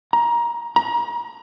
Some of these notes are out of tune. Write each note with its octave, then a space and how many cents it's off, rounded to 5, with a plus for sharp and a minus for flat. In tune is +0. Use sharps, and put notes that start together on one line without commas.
A#5 +20
A#5 +35